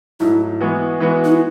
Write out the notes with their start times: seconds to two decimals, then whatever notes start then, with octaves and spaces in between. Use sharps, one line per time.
0.20 G#2 F#3 A3 E4
0.61 E3 G#3 B3 F#4
1.00 E3 G#3 B3 F#4
1.25 D#4
1.32 E4